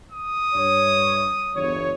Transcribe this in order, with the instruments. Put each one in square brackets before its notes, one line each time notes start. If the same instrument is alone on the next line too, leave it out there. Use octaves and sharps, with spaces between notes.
[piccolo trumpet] D#6
[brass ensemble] G2 C#5
G1 E2 C#5